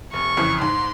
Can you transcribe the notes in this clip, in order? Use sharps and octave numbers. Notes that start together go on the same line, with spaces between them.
F1 C#6
F2 C#3 E3
G#2 C6